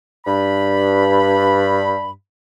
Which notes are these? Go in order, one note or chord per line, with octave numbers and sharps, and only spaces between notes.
G2 B5